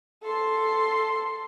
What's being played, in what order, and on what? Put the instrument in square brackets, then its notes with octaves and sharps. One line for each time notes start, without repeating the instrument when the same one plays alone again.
[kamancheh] A4 C6